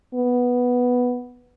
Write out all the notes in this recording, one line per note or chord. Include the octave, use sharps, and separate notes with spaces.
B3